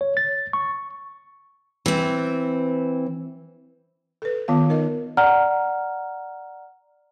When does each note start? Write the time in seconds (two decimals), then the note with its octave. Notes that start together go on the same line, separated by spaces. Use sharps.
0.01 C#5
0.17 A6
0.53 C#6
1.86 E3 C4
4.22 A4 B4
4.48 D#3 B3 F4 F5
4.69 D#4 A#4 D#5
5.17 D5 F#5 A#5 F6